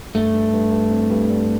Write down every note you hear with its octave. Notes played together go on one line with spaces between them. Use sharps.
G2 A3
G2
G2
G2
C4
G2
G3